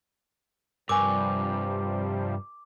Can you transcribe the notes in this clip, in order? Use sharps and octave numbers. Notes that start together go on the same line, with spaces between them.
G2 C3 F3 G3 A#4 G#5 C#6 D6